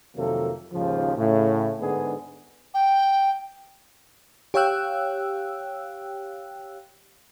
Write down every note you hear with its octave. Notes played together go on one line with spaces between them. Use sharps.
F2 C3 D#3 F#3 A#3 A4
D#2 G#2 C#3 F3
A2 C#3
G#2 D3 B3 D4 G#4
G5
G4 C#5 F5 G5 E6 F#6